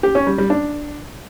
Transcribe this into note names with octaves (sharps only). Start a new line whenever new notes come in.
G4
C#4
G3
G3
D4